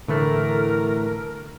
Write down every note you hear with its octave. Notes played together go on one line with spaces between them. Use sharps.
A2 D3 E3 A3 A#4